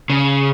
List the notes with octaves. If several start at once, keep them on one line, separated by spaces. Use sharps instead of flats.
C#3